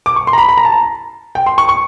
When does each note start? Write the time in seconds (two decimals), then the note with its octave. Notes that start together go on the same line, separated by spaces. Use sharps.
0.06 D6
0.16 C#6
0.27 C6
0.33 A#5
0.38 B5
0.49 B5
0.57 A#5
0.65 A5
0.72 A#5
1.35 G5
1.46 C6
1.58 C#6
1.69 C#6